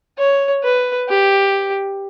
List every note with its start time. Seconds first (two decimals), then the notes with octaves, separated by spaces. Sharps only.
0.18 C#5
0.64 B4
1.09 G4